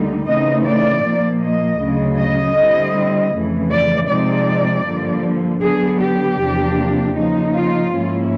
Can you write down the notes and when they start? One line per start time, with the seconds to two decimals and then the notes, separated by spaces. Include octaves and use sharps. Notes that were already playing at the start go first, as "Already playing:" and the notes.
Already playing: D2 D3 G3 A#3 D#4
0.27 C#3 E3 A3 C4 D#4 D#5
0.65 D5
1.03 A#2 F3 A#3
1.41 D#5
1.80 D2 C#3 F#3
2.18 D#5
2.56 D3 G3 C4 E4
3.33 F2 C#3 E3 A3
3.71 D5
4.09 C3 F3 G#3 C4 D#4 D5
4.86 G2 D3 F3 A#3
5.62 D3 F#3 B3 D4 G#4
6.00 G4
6.38 E2 C3 F3 A#3 D4
7.15 C#3 F3 A#3 D#4
7.53 F4
7.91 G#2 F3 A#3 C#4 E4